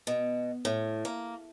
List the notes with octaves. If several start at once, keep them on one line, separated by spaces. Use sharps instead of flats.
B2
A2
A#3